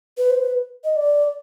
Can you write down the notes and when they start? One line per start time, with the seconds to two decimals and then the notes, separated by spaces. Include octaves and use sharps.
0.18 B4
0.30 C5
0.42 B4
0.84 D#5
0.96 D5